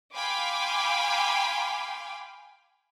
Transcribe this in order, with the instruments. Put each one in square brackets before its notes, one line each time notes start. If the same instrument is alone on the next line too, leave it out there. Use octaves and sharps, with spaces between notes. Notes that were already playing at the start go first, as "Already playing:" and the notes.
[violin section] F5 G5 G#5 B5 C6 D6